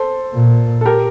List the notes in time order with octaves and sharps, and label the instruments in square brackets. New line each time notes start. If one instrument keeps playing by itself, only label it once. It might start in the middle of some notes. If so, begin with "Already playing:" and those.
Already playing: [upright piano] A4 C5
[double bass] A#2
[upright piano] A4
G4 A#4